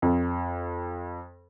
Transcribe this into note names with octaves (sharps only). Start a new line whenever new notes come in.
F2